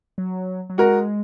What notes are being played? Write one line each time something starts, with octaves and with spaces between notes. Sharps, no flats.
F#3
F#3
G#3 F#4 A#4